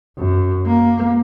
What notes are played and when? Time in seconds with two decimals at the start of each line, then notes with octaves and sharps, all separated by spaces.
0.18 F#2
0.66 A#3